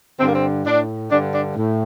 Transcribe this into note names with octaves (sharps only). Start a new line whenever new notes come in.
G2 D3 C4
A#3
C4
A2 D4
G2 D3 D4
D4
A2